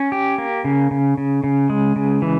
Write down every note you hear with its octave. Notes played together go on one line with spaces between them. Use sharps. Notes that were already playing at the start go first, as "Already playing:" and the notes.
Already playing: C#4
G4
A#3
C#3
C#3
C#3
C#3
G#3
C#3
E3